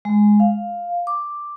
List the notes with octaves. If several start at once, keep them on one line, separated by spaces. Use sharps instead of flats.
G#3
F5
D6